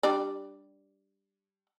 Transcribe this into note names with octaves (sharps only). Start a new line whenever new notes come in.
G3 D4 D5